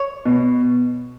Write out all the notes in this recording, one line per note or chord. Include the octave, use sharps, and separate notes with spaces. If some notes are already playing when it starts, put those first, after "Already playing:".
Already playing: C#5
B2